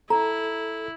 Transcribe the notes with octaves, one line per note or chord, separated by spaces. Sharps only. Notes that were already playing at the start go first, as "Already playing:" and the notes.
E4 A4 A#5